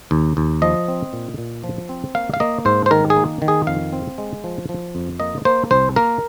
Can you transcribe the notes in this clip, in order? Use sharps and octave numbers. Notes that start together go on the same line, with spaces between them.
D#2
D#2
F3 D#5
C4
A#2
A#2
F3
C4
A#3 F5
F5
A#3 D#5
G#2 C5
C5
D#3 A#4
G#4
A#3
D#3
G#4
F2 F5
C4
G#3
F3
F3
F2
A#3 D#5
A#3 C5
C2 C5
A#3 A#4